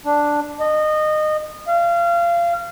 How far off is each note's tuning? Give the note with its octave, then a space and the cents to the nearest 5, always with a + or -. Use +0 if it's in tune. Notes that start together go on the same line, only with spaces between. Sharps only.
D4 +0
D#5 -20
F5 -25